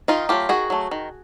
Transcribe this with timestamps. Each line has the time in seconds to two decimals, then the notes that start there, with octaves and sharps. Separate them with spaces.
0.08 D#3 D#4 F4
0.29 F#3 A3 F4 G4
0.49 D#3 F#4 G#4
0.70 F#3 A3
0.91 D#3